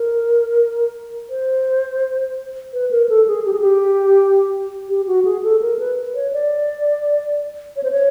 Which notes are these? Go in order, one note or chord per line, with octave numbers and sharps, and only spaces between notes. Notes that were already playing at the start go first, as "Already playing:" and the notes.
Already playing: A#4
C5
B4
A#4
A4
G#4
G4
G#4
G4
G4
F#4
G#4
A4
A#4
B4
C#5
D5
C#5
C5
C#5